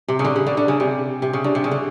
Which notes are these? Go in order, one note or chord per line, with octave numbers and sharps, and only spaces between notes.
C3
C#3
D3
C#3
D3
D3
C#3
C3
C3
C#3
D3
C3
C#3
D3